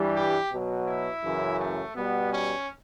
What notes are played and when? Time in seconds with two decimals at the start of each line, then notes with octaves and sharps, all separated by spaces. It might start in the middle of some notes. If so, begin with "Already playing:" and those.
Already playing: G2 E3 G3
0.16 G4
0.52 B2 F#3
0.87 E4
1.24 F#2 C#3 E3
1.59 A3
1.95 B2 G3 B3
2.32 C#4